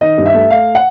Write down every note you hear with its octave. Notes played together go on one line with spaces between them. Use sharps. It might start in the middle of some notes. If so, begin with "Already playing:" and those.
D#3 D#5
G2
E5
A3
A3 F5
F#5